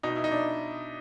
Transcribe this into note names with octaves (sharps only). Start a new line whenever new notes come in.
B2 D#4
E4
D#4
D4